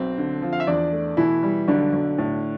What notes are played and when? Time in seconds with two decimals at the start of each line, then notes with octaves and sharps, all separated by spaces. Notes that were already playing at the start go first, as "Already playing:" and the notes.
Already playing: B1 C4
0.18 D3
0.42 F3
0.53 F5
0.60 E5
0.67 E2 D4 D5
0.93 A3
1.17 B2 E3 E4
1.43 G3
1.68 B1 D3 D4
1.93 B1
2.18 A2